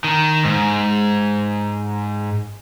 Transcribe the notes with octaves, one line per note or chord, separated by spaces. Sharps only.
D#3
G#2